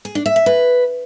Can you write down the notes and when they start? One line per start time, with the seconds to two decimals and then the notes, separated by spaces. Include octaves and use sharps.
0.05 G#4
0.15 D4
0.26 E5
0.36 E5
0.46 B4